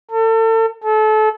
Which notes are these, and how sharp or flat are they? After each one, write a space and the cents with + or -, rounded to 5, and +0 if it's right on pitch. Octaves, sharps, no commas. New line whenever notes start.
A4 +35
A4 -30